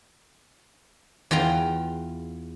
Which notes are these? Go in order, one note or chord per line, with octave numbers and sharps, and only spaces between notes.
E2 F4 G5 A#5